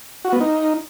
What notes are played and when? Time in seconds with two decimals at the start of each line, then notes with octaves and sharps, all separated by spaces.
0.25 F#4
0.33 B3
0.41 D#4